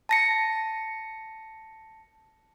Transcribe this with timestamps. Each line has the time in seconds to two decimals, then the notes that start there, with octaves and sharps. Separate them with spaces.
0.09 A5 A#6 C#7